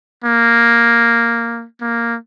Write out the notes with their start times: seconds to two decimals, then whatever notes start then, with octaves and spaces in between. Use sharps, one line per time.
0.24 A#3
1.81 A#3